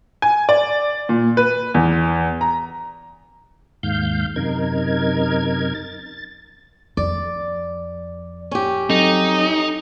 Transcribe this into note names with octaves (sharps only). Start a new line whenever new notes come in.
G#5
D5
A#2
B4
E2
A#5
D#2 G#2 F5 G6
F#2 C3 D#4 A#4 G#6
A6
F2 D5
C#4 G4
F#3 C4 D#4 A4